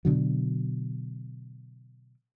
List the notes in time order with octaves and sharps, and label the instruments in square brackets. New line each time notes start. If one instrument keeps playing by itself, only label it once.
[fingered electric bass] B2 D3 F#3